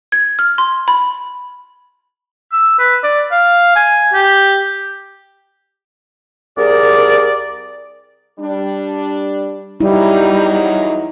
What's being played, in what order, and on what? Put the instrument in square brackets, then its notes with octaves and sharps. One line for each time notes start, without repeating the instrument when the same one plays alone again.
[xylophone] G#6
F6
C6
B5
[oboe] E6
B4
D5
F5
G#5
G4
[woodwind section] C2 G#4 A#4 D5
[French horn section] G3 D4
[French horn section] E2 F#3 D#4 [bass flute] G3 [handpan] E4